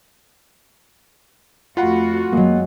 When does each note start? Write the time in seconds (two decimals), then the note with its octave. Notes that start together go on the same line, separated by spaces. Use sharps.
1.77 F2 A3 F4 F#4 F#5 B5
2.33 F#2 F#3 G#3 A#3